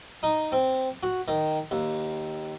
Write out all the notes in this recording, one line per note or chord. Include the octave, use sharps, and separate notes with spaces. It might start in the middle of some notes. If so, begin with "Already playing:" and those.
D#4
C4
F#4
D#3
D#2